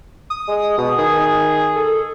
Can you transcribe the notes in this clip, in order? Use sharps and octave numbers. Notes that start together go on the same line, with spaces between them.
D#6
G#3
B2
D#3 G#4
A4